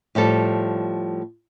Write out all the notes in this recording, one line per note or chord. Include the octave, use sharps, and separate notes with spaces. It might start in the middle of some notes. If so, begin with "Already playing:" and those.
A2 F3 G3 A4